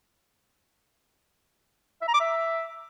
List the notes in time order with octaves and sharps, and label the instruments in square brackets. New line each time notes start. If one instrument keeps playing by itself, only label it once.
[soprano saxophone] E5
A#5
D6
E5